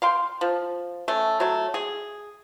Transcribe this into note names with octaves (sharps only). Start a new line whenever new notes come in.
F5 G5 C6
F3
A3 C#4
F#3 A3
G#4